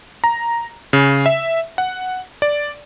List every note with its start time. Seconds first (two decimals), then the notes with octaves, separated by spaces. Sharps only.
0.24 A#5
0.93 C#3
1.26 E5
1.78 F#5
2.42 D5